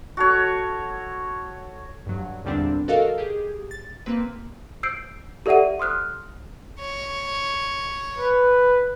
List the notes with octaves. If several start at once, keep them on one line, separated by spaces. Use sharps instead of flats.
F#4 A4 C#5
G2 F#3
E2 A#2 D3 G3 C4 D4
F#4 A4 A#4 D#5 F5
G4 G#4
A6
A#3 C4 B4
E6 G6 C7 D7
G4 A4 D5 E5 F#5 D#7
C6 D#6 F6 F#6
C#5
B4